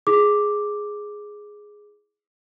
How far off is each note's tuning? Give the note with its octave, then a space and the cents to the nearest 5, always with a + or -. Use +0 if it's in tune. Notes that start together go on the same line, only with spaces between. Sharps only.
E4 +0 G#4 +0 D6 +0